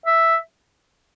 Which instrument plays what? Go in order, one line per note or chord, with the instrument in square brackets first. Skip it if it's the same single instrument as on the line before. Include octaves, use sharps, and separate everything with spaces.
[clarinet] E5